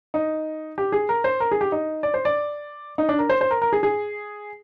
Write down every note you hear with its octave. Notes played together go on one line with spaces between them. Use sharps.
D#4
G4
G#4
A#4
C5
A#4
G#4
G4
D#4
D5
C5
D5
D#4
D4
A#4
C5
C5
A#4
A#4
G#4
G#4